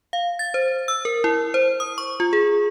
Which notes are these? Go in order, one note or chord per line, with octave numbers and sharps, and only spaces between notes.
F5
A6
C5
E6
A#4
E4
C5
D#6
C#6
F4
G#4